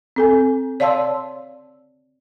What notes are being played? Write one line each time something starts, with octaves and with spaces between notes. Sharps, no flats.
C4 A4 G#5
C#5 D5 F5 A5 C6 E6